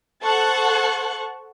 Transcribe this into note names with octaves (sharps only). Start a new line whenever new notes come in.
A4 C5 F#5 A5 C#6 F#6